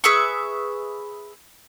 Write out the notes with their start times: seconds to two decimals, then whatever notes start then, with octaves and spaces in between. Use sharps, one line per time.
0.04 G#4 B4 E5 C#6